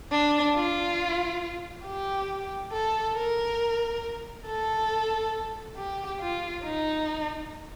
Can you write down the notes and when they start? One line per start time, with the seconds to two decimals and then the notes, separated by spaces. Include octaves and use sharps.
0.11 D4
0.55 F4
1.85 G4
2.73 A4
3.15 A#4
4.46 A4
5.77 G4
6.21 F4
6.64 D#4